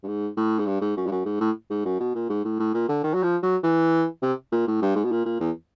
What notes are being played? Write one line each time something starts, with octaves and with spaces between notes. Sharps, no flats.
G2
G#2
A2
G#2
G2
G#2
F#2
G2
F#2
G#2
A2
G#2
F#2
B2
A#2
G#2
A2
A2
A#2
D3
D#3
F#3
F3
F#3
E3
C3
A#2
A2
G2
G#2
B2
A#2
A#2
E2